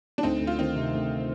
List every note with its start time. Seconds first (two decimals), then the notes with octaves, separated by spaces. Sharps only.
0.18 D4
0.23 D2 C4 D#4
0.41 D2
0.47 F4
0.59 D#3 C4 D#4
0.76 C3
0.93 D2